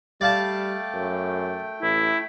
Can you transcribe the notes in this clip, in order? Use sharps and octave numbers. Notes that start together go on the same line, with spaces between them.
G3 A3 D5 F5 G5 A5
F#2
A1 E4